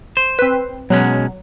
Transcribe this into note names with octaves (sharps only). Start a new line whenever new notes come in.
C5
C4 B4
B2 F#3 G#3 C#4